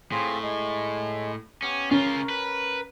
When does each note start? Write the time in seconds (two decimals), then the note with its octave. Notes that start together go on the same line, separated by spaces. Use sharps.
0.12 A2 C4 F4 G#4
0.43 G#3
1.62 B3 C#4 G4
1.91 C#3 C#4 F4 A#4
2.30 B4